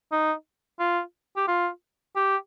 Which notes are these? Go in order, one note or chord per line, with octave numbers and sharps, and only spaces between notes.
D#4
F4
G4
F4
G4